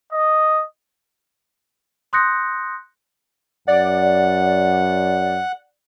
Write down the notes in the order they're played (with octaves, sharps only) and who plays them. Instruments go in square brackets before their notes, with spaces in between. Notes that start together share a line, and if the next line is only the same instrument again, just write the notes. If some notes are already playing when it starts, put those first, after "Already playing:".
[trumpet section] D#5
[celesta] C6 D#6 F#6 G6 A#6 C#7
[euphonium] F#2 [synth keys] D5 [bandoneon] F#5